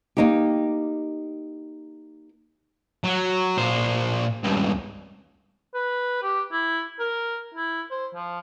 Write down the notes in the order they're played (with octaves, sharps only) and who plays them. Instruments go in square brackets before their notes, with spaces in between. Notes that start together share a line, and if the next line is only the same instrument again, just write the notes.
[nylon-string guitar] A#3 D#4 G4
[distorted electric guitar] F#3
A#2 C5
C#2 G2
[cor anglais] B4
G4
E4
A#4
E4
C5
F3